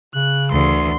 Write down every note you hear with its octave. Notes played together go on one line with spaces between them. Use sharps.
C#3 F#6
D2 E3 C6